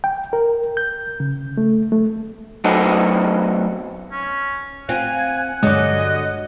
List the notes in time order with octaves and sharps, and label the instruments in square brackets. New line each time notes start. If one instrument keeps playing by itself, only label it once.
[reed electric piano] G5
A#4
G6
C#3
A3
A3
[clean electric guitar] F#3 A3 B3 C4 D#4 A4
[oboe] C#4
[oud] C4 F4 [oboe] F#5 [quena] G#5
[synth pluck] G2 G#3 [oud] D3 F#3 [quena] D#5